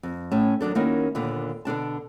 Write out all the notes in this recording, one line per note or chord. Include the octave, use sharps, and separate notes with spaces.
F2
A2 C#4 A5
D#2 F#3 D4 A4
D#3 A#3 C#4 D#4 E4 F#4
D#2 A#2 D3 B3
B2 D3 D4 A5